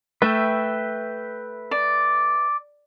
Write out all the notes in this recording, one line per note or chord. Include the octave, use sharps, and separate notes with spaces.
A3 B4 E5 G5
D5